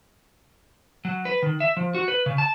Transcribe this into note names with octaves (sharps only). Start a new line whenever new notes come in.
F#3
B4
D#3
E5
F3
F#4
B4
C#3
A5